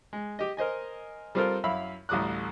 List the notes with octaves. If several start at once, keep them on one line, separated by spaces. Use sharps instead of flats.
G#3
G4 D#5
A#4 C5 D#5 G#5
G3 C4 F4 A4 A#4 C5
F#2 E4 F5 B5 E6
A1 D2 G3 D6 D#6 F#6